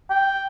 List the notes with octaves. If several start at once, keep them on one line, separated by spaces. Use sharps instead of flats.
G5